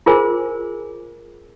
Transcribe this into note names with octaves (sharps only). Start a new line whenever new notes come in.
F4 G#4 A#4 C5 G#5